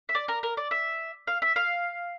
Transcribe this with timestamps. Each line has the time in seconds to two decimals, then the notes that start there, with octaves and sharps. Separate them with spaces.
0.09 E5
0.15 D5
0.28 A#4
0.43 A#4
0.57 D5
0.71 E5
1.27 F5
1.42 E5
1.56 F5